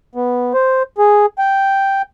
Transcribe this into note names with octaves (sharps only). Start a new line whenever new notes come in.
B3
C5
G#4
G5